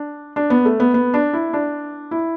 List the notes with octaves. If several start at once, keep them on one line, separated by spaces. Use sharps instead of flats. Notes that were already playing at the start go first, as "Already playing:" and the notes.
Already playing: D4
D4
B3
A3
B3
B3
D4
E4
D4
E4